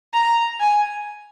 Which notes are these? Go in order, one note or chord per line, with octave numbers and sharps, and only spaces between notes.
A#5
G#5